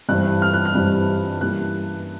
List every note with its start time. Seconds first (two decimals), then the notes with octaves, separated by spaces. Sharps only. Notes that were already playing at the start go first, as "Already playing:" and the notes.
0.09 G2 E3 G3 C4 F#6
0.42 F6
0.54 F#6
0.65 F6
0.75 G2 E3 G3 C4
1.41 G2 E3 G3 A#3 C#4 F#6